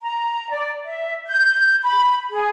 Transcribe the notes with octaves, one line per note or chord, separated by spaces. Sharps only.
A#5
D5
E5
G6
B5
G#4